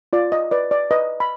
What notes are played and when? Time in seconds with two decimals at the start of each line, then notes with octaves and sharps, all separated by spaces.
0.13 F4 D5
0.32 D#5
0.51 B4 D5
0.71 D5
0.91 B4 D#5
1.20 B5